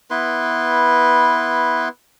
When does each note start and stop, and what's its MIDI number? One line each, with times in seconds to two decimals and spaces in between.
0.10 1.89 59
0.10 1.89 64
0.10 1.89 71
0.10 1.89 84